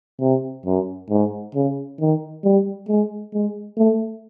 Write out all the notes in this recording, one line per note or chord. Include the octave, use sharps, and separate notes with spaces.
C3
F#2
G#2
C#3
D#3
G3
G#3
G#3
A3